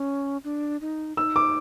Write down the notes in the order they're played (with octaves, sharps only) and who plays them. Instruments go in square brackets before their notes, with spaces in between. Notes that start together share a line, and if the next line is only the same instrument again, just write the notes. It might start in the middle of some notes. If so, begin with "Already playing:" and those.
Already playing: [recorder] C#4
D4
D#4
[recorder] D#4 [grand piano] E6
[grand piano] D6